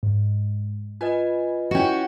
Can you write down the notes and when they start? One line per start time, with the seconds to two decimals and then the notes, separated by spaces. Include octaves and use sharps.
0.03 G#2
1.01 F4 B4 D#5 G#5
1.71 C#4 E4 F#4 G5